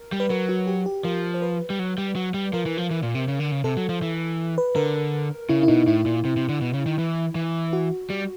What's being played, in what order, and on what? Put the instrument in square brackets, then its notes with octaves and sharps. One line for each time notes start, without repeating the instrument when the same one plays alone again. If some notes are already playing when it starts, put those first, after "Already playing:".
Already playing: [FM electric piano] A#4
[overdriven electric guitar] G3
[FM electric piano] B4
[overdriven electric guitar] F#3 [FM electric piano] A#4
[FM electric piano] F#4
G4
G4
[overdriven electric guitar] F3 [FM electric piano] A#4
[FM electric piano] C5
B4
[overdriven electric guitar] G3
F#3
G3
F#3
G3
[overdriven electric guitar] F3 [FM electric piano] A#4
[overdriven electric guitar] E3
F3
E3
A#2
C3
C#3
D3
C#3
[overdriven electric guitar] C3 [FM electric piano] A4
[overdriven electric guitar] F#3
F3
E3
[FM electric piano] B4
[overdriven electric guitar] D3 [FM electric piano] A#4
[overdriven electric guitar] C#3 [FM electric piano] E4
[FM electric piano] E4
[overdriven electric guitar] B2 [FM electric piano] D#4
[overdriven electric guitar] A2 [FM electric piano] E4
[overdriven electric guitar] A#2
C3
C3
D3
B2
C#3
D#3
E3
E3
[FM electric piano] F#4
[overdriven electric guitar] G3